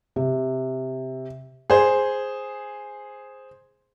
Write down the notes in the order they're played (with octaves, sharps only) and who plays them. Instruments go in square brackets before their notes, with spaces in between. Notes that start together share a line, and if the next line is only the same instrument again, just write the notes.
[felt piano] C3
[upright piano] G#4 C5